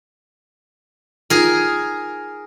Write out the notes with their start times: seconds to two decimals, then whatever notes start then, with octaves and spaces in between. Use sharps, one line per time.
1.30 D#4 F4 G#4 A#4